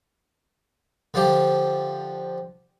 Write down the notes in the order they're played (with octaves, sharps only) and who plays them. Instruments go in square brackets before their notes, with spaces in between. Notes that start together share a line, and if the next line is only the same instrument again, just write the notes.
[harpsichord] D3 F3 G4